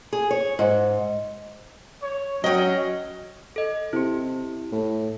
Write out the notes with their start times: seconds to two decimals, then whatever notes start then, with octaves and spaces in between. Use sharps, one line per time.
0.13 G#4
0.31 C#5
0.59 G#2
2.02 C#5
2.44 F#3 C#4 D#5 G5
3.56 A4 D#5
3.93 C3 E4 G4
4.72 A2